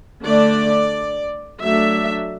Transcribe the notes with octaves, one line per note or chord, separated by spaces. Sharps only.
D3 A3 D4 D5
F#3 A3 D4 E5